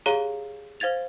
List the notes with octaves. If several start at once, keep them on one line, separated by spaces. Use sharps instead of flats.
G4 G#4 C#5 F5 A#5 G7
C5 F5 G#6 A6 F7